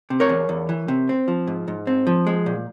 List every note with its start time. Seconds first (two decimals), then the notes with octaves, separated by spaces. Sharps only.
0.10 C3
0.20 A#4 C#5
0.29 E2
0.49 E2
0.69 E3
0.88 C3
1.09 C4
1.28 F3
1.47 G#2
1.68 G#2
1.87 C4
2.07 F3
2.27 G#3
2.46 A#2